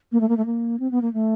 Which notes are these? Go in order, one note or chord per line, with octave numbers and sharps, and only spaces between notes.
A#3
A3
A#3
A3
A#3
C4
B3
A#3
A3